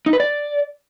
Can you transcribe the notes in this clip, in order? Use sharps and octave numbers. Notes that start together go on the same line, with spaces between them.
D#4
B4
D5